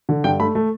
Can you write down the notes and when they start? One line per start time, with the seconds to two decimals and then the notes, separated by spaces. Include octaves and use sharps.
0.09 D3
0.24 G2 G5
0.40 A3 B5
0.55 A3